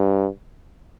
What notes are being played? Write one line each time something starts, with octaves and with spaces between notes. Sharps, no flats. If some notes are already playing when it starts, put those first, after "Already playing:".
Already playing: G2